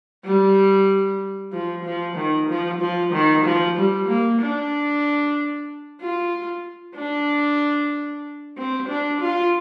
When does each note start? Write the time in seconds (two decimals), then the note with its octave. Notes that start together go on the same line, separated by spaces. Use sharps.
0.25 G3
1.52 F3
1.85 F3
2.16 D#3
2.49 F3
2.81 F3
3.12 D#3
3.45 F3
3.77 G3
4.08 A#3
4.41 D4
6.00 F4
6.96 D4
8.57 C4
8.89 D4
9.20 F4